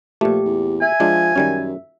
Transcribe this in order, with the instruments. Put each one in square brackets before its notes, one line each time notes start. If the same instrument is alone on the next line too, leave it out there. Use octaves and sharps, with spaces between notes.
[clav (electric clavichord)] A#2 A3 [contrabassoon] F3 [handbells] G4
[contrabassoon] E2
[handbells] E5 [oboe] G#5
[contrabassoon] F3 [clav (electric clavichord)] G#3 D4
[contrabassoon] F#2 [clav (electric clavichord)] D#3 G3 C#4